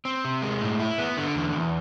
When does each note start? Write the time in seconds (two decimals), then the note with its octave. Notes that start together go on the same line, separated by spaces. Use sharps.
0.05 C4
0.25 C3
0.42 G#3
0.61 A2
0.79 E4
0.98 B3
1.17 D3
1.35 E2
1.54 E2